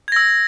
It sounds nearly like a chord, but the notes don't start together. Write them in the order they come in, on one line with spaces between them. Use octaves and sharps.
G#6 A#6 E6